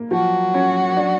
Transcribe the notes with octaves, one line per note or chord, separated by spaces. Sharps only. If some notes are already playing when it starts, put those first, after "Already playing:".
Already playing: A#3
F3 F#3 F#4
C#4
D4